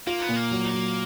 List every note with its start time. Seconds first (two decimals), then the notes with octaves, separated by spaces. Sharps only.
0.07 A#3 F4
0.22 B3
0.29 A#2
0.36 A#3
0.51 F#3
0.73 F#3